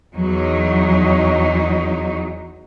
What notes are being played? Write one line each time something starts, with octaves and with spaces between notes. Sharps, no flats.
E2 F#3 D#4